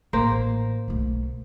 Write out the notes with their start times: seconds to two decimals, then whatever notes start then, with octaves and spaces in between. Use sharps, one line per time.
0.13 A1 A#3 C5
0.88 B1 A3